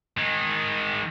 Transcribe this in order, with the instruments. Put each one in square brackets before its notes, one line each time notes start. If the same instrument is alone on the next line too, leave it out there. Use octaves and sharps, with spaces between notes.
[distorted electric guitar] D#3 G#3